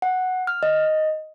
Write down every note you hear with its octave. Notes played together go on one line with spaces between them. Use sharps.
F#5
F6
D#5